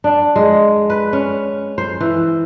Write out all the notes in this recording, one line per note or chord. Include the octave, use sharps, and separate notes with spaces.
D4
G#3
B4
C#4
C5
E3